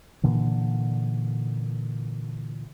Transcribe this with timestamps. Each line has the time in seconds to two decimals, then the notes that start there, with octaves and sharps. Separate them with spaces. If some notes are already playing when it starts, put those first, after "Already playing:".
0.23 A#2 D3 E3